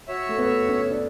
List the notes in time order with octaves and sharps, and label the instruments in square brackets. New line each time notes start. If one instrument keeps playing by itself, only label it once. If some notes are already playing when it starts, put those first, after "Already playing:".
[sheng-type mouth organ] F#4 C#5 E5
[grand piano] A3
B3
C#4
D4